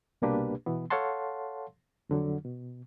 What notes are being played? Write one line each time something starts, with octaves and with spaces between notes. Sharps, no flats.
C2 B2 A#3 D4 G4 B4
B2 E3 B3
A4 C#5 F5 F#5 A5 C6
F2 D3 F#3
B2